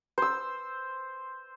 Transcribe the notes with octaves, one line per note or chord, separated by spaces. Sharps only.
C5 E6